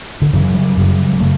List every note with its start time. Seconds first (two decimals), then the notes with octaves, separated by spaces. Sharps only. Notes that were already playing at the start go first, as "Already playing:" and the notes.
0.22 D3
0.33 F#2 C#3 E3
0.54 G3
0.77 F#2 C#3
1.13 G3
1.20 C#3 A3